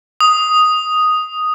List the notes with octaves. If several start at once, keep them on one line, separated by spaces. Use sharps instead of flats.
D#6